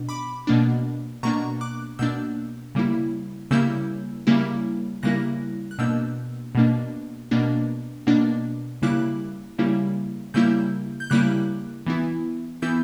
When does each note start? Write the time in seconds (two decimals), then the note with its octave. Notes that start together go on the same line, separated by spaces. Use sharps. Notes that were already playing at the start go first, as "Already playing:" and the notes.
Already playing: B2 D4
0.09 B5 D6
0.47 B2 A#3 D4
1.23 B2 A#3 D4 A#5 C#6
1.61 D6 F#6
1.99 B2 A#3 D4 E6 G6
2.75 C#3 G3 A#3 E4
3.51 C#3 G3 A#3 E4 E6 G6
4.27 C#3 G3 A#3 E4
5.03 C#3 G3 A#3 E4 F#6 A#6
5.71 F#6
5.78 B2 A#3 D4 E6 G6
6.55 B2 A#3 D4
7.31 B2 A#3 D4
8.07 B2 A#3 D4
8.82 C#3 G3 A#3 E4 D6 F#6
9.58 C#3 G3 A#3 E4
10.34 C#3 G3 A#3 E4 E6 G6
11.00 G6
11.10 C#3 G3 A#3 E4 D6 F#6
11.87 E3 B3 E4
12.62 E3 B3 E4 E6 G6